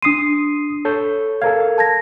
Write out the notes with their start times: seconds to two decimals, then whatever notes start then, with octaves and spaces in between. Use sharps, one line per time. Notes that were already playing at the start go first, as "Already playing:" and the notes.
0.02 D4 C6 D#6 C7 D#7
0.85 A4 C#5 G6
1.42 A4 A#4 F5 G#6
1.78 A5 G#6 A#6